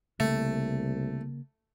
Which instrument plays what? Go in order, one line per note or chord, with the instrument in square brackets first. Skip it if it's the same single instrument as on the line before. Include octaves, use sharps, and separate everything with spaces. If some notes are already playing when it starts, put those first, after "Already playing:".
[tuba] C2 [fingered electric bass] C#3 A#3 [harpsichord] A3